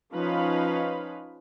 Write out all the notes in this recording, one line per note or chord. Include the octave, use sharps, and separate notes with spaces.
F3 C#4 D#4 B4 F5 B5